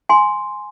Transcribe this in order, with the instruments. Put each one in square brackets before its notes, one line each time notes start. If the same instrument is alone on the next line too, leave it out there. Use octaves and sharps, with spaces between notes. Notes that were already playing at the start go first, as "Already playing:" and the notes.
[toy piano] G#5 C6